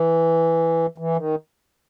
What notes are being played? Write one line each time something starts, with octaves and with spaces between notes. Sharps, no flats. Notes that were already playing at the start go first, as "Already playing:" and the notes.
Already playing: E3
E3
D#3